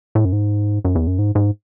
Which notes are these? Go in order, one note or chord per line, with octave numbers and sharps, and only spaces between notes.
A2
F#2
G#2
F#2
E2
F#2
G#2
G#2